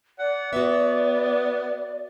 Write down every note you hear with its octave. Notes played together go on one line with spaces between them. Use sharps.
D5 F#5
B3 F#4 C#5 E5